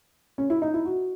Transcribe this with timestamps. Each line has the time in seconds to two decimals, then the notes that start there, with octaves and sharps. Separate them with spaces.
0.38 C#4
0.50 E4
0.62 D#4
0.74 E4
0.85 F#4